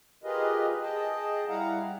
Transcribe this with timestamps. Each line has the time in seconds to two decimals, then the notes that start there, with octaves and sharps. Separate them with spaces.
0.24 F4 G4 G#4 A#4 B4 D#5
0.82 G#4 D#5 G5 A5
1.48 G3 E4 F5 F#5 A#5